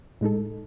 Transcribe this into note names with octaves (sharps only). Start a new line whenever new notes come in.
A2 G#3 D#4 A4